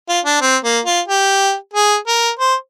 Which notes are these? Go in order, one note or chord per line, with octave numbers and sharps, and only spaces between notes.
F4
D4
C4
A#3
F4
G4
G#4
A#4
C5